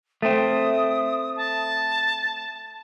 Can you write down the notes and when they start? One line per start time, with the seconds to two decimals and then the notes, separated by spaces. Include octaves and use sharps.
0.22 A3 C4 D#6
1.36 A5